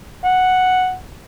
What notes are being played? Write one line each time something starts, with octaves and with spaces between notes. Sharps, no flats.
F#5